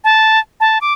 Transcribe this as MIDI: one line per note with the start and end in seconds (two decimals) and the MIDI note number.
0.04 0.40 81
0.60 0.79 81
0.81 0.93 86